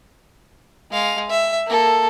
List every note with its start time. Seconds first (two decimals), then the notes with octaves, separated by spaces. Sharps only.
0.91 G#3 F5
1.29 E5
1.67 A#3 A4